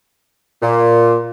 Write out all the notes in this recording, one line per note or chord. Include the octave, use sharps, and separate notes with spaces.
A#2